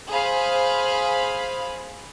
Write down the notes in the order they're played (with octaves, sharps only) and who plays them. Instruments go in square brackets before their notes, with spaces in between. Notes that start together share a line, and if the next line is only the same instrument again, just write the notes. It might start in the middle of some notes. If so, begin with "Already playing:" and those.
[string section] G#4 C5 F5 B5